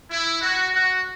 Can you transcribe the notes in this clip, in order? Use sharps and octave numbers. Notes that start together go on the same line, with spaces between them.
E4
F#4
F#4